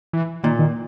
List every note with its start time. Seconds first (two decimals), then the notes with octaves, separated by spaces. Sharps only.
0.13 E3
0.43 A#2 D#3
0.59 D#3